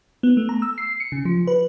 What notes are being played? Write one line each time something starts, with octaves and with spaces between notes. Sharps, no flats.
B3
A3
A#5
E6
C7
C#7
C#3
F3
B4